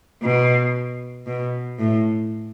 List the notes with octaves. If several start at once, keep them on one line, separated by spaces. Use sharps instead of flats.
B2
B2
A2